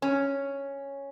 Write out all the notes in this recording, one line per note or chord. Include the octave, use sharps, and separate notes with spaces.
C#4